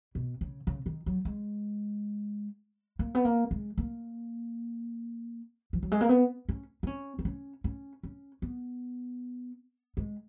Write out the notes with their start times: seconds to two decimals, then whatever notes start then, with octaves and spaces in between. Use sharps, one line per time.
0.15 B2
0.41 C#3
0.67 C#3
0.86 D#3
1.06 F#3
1.25 G#3
2.99 A#3
3.15 B3
3.25 A#3
3.51 G#3
3.78 A#3
5.73 F3
5.83 F#3
5.92 G#3
6.01 A#3
6.09 B3
6.49 C#4
6.83 D#4
6.87 C#4
7.19 B3
7.25 C#4
7.64 C#4
8.03 C#4
8.42 B3
9.97 G#3